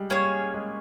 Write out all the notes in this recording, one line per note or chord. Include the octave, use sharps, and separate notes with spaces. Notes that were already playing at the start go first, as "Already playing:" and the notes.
Already playing: G3 G#3
G3 A#3 C#4 G#4 C#5
G#3